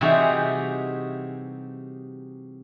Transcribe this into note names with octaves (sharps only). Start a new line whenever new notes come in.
C3 E3 G3 D#4 F#4 G#4